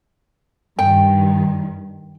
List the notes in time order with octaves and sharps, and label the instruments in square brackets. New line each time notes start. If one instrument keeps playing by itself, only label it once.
[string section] G2 D#3 [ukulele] G5